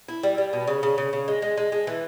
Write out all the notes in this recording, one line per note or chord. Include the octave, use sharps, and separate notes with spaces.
E4
G3
G3
B2
C#3
C#3
C#3
C#3
G#3
G#3
G#3
G#3
E3